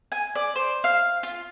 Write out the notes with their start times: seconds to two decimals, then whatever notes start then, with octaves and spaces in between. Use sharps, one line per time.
0.12 G#5
0.35 D5
0.55 C5
0.84 F5
1.23 F4